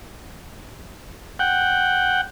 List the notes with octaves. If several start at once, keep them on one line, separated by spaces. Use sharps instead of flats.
F#5 G5